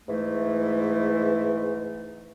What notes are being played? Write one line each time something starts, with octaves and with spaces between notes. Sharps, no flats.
G#2 E3 A3